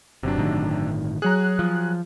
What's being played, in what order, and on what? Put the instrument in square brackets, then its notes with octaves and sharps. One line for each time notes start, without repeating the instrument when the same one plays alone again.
[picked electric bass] G1 [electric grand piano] C3 F#3 D4
[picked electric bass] G1 A2 D#3
[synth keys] F#3 F#6 [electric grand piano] G#4 C#5 A#5
[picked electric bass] F3